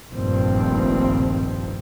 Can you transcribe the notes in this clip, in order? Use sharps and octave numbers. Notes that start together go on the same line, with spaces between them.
F1 A#1 G2 D#3 F3 C4